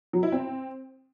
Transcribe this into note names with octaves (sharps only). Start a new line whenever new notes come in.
F#3
E4
C4